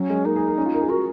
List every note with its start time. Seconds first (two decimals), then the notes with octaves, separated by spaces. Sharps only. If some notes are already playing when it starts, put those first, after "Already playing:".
Already playing: F#3 C#4
0.10 G#3
0.25 A#3 D#4
0.36 G#4
0.47 A#4
0.58 C#4
0.66 F4
0.74 A#4
0.81 G#4
0.89 F#4 A#4